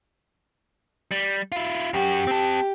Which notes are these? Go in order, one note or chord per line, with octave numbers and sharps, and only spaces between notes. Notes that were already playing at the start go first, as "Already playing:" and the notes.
G3
E4 F4
F#2 F#4 G4
C4 A5